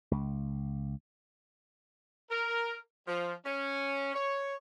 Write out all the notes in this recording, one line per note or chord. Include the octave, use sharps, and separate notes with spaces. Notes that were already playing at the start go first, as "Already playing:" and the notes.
C#2
A#4
F3
C#4
C#5